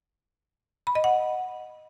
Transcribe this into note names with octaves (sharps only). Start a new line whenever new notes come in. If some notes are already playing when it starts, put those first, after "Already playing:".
B5
D#5
F#5